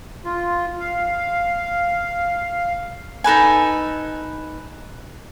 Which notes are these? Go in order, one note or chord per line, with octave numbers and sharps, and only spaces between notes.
F4
F5
D#4 A4 B4 G#5